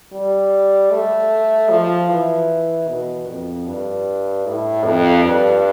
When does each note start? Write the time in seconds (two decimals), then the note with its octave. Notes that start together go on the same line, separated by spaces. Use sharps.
0.12 G3
0.91 A3
1.70 F3
2.09 E3
2.88 B2
3.28 F2
3.67 G2
4.46 A2
4.85 F2
5.24 G2